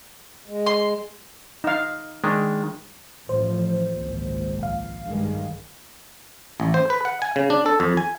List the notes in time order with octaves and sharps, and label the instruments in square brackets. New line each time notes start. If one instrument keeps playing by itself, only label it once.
[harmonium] G#3
[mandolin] C6
[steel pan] D#4 F5
[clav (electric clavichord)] D#3 G#3 D4
[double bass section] A1 F3 [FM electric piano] C5
[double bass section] G#1 C#2 A#2
[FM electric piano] A#1 F5
[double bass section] G2 D#3 G#3
[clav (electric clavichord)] A1
C5
B4
F#5
G#5
C#3
D4
A4
F2
G#5